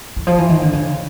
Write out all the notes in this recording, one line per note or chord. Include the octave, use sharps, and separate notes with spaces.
E3
F3
E3
D#3
D3
C#3